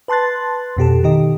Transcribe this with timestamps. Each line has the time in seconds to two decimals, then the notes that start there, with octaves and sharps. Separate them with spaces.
0.08 B4 A5 C6 F#6 A6
0.77 F2 B2 G4 A4
1.03 B2 D#3 G4 D#5